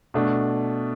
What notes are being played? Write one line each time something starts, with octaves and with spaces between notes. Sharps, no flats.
B2 A3 D4